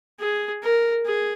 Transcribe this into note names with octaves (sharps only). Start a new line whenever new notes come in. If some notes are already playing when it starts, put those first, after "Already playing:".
G#4
A#4
G#4